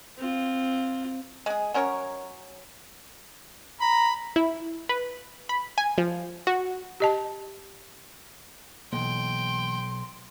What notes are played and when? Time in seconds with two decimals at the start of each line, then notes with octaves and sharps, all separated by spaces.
0.18 C4 F4
1.46 G#3 G#4
1.74 F#3 C#4 A#4 C#5
3.81 A#5 B5
4.36 E4
4.89 B4
5.49 B5
5.78 G#5
5.98 F3
6.47 F#4
7.00 G4 D#5 A5
8.93 B1 E3 A#3 G5 C6